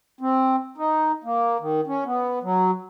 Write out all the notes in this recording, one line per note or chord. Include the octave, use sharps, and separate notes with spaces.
C4
D#4
A#3
D#3
C#4
B3
F#3